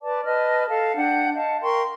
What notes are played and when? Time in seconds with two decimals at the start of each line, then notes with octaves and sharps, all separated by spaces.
0.02 B4 D5 A5 D6
0.25 B4 D#5 A5 F6
0.68 A4 F5 A5
0.96 D4 F#5 G5 G6
1.34 D#5 F5 A5
1.62 A#4 G5 C6 C#6